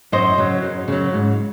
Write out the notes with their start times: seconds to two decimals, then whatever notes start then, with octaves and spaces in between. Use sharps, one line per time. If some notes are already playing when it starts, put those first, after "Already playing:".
0.12 F#2 C5 D#5
0.38 C#3 F#3
0.62 F#2
0.88 C#3 F#3
1.13 G#2